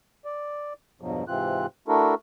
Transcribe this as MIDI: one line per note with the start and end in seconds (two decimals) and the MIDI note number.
0.25 0.73 74
1.01 1.24 40
1.01 1.24 43
1.01 1.24 47
1.01 1.24 53
1.01 1.24 54
1.28 1.66 44
1.28 1.66 48
1.28 1.66 52
1.28 1.66 60
1.28 1.66 65
1.28 1.66 90
1.88 2.15 57
1.88 2.15 62
1.88 2.15 64
1.88 2.15 66
1.88 2.15 69
1.88 2.15 70